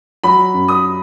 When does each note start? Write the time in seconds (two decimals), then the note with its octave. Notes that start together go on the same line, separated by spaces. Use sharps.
0.24 F#3 B5
0.54 F#2
0.68 D#6